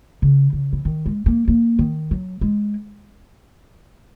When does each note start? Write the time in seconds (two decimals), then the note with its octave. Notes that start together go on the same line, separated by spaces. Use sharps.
0.22 C#3
0.53 C#3
0.73 E3
0.85 D#3
1.06 G#3
1.26 A#3
1.48 A#3
1.79 D#3
2.11 F#3
2.41 G#3